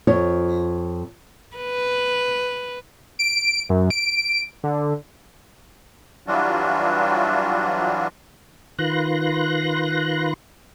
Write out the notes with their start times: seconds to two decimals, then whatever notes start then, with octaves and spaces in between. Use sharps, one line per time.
0.07 F2 F4 C#5
1.57 B4
3.19 D7
3.69 F#2
3.90 D7
4.63 D3
6.27 E3 F#3 G3 D4 F4 F#4
8.79 D#3 F4 B4 C6 F#6 A#6